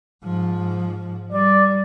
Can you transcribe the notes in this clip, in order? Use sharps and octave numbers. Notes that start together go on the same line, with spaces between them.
G#2 F3
G3 D5